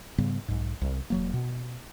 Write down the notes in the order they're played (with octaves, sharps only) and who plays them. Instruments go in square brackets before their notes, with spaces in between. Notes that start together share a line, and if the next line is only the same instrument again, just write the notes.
[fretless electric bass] G#2 C#3 G3 B3
B1 G#2
C2
E1 F#3 A#3
B2